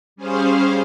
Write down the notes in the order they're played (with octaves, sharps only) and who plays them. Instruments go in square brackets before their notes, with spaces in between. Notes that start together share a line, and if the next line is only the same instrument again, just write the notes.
[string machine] G3 C#4 G#4 C5 F5